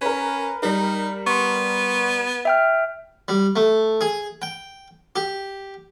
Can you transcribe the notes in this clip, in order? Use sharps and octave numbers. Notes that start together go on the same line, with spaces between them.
C#4 A#4 B4
G3 D#4 A#4
B3 C6 C#6
E5 G5 F6
G3
A3
G#4
G5
G4